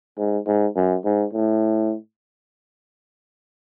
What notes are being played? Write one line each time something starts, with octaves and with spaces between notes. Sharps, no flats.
G#2
G#2
F#2
G#2
A2